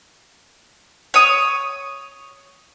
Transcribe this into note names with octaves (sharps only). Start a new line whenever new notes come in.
C#5 D#6